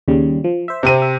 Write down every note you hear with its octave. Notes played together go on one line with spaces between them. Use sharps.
D#2 C#3 G3
F3
C5 E5
C3 C4 D#7
E5